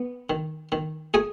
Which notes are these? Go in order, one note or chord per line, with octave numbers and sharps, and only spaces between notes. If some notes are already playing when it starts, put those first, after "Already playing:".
Already playing: B3
D#3
D#3
A3 G#4 G#5